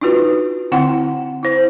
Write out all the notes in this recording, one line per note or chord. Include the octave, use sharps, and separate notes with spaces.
D4 D#4 F4 F#4 B4
D3 C4 E4 F#5 G5 C6
E4 C5